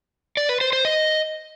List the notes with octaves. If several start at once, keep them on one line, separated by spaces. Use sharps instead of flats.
D5
B4
C5
C5
D#5